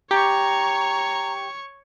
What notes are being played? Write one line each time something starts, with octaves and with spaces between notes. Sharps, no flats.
G4 C#5 A#5 C#6